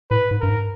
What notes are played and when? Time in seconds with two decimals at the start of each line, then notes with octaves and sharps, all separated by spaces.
0.11 A2 B4
0.31 G#2
0.41 G2 A#4
0.49 G#2